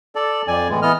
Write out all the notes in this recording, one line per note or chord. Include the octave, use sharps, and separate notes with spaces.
A4 D5
F2 D5 G#5
A2 E3 G#3
E3 B3 D#5 F6